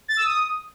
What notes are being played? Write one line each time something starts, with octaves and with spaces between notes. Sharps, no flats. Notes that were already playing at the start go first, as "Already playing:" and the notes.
A6
E6
D#6